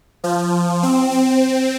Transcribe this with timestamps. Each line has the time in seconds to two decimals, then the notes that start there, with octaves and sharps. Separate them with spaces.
0.24 F3
0.83 C4
1.11 C4